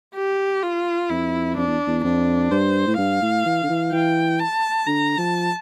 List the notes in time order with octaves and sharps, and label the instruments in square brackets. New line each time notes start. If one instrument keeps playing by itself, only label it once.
[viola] G4
F4
[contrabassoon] F2 [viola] E4
[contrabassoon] F2 [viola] D4
[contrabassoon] E2
E2
[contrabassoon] F2 [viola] D4
[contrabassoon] G2 [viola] C5
[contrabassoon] A2
[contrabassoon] G2 [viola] F5
[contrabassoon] A2
E3
D3
E3
[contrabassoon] E3 [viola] G5
[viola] A5
[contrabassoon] D3 [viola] A#5
[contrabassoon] F3 [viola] A5